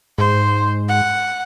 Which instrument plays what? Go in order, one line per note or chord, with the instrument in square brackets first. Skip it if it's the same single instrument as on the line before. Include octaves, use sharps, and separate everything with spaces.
[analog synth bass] G#2 [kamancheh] C5
[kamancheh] F#5